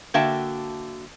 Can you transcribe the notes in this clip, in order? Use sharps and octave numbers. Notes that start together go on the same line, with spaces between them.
D3 A#3 F#4 E5 G5 A5